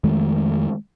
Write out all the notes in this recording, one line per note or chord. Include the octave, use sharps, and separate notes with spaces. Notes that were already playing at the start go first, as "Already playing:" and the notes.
F2 D#3 G#3 A3